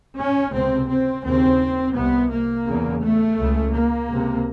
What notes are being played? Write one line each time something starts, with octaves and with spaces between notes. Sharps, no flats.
C#4
C#2 C3 C4
C4
D#2 C#3 C4
C2 C3 B3
A#3
E2 C#3
A3
C#2 C#3
A#3
C#2 C3